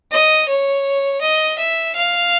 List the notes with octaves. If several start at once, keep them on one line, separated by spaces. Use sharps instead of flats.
D#5
C#5
D#5
E5
F5